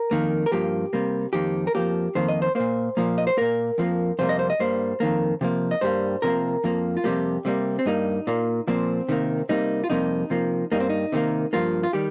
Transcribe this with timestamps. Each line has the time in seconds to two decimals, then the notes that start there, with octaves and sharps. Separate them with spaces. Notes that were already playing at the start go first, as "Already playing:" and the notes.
Already playing: A#4
0.11 F2 D#3 A#3
0.46 A#4
0.52 G2 F3 A#3 G4
0.93 C3 G3 A#3
1.33 F2 D#3 A#3 G4
1.67 A#4
1.75 F2 F3 A#3 G4
2.15 F2 D#3 A#3 C5
2.28 D#5
2.42 C5
2.55 A#2 A#3 C5
2.97 A#2 F3 A#3
3.18 D#5
3.27 C5
3.37 A#2 A#3 A#4
3.78 F2 F3 A#3
4.19 F2 C3 G3 A#3 C5
4.29 D#5
4.39 C5
4.50 D#5
4.59 G2 G3 A#3 C5
5.00 F2 D#3 A#3
5.41 C3 F3 A#3
5.71 D#5
5.81 G2 G3 A#3 C5
6.22 C3 F3 A#3 A#4
6.64 F2 F3 A#3
6.97 F4
7.04 F2 C3 G3 A#3 G4
7.45 C3 G3 A#3
7.79 C4
7.86 G2 G3 A#3 D#4
8.27 A#2 A#3
8.68 A#2 F3 A#3 C4
9.09 C3 D#3 A#3
9.49 C3 G3 A#3 D#4
9.84 F4
9.90 F2 C3 G3 A#3 D#4
10.30 C3 F3 A#3
10.72 G2 G3 A#3 D#4
10.80 C4
10.89 D#4
11.12 C3 D#3 A#3
11.53 G2 F3 A#3 F4
11.83 F4
11.93 D#3 G3 G4